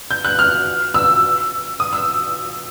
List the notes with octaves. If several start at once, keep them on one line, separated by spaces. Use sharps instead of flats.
G6
F#6
F6
E6
D#6
E6